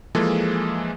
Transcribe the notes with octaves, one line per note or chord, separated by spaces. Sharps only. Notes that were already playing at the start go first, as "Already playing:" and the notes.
E3 F3 G#3 A#3 G#4 A4